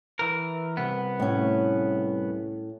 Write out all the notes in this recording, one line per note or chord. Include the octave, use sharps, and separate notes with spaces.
E3 A#4
C2 B3
A2 C#4